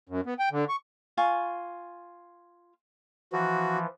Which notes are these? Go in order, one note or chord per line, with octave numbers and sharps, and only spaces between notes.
F#2
B3
G5
D3
C#6
F4 G#5 C#6
E3 F3 F#4